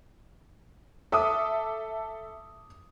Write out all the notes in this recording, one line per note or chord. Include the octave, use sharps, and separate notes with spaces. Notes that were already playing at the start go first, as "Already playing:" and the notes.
A4 E5 D6 D#6